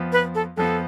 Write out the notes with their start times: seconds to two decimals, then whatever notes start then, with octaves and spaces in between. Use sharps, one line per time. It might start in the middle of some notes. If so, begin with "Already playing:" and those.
Already playing: F2 F3 B3
0.12 B4
0.35 A4
0.57 F2 F3 B3 A4